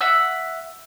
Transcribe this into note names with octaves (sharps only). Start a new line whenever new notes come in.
E5 F#5 E6